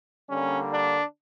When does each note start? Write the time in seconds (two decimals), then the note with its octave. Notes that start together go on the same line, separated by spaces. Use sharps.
0.28 D3 G3 A#3 C#4
0.72 D4